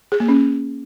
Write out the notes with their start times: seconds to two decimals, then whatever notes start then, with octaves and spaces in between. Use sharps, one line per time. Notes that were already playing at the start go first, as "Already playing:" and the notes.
0.12 G#4
0.20 A#3
0.29 C#4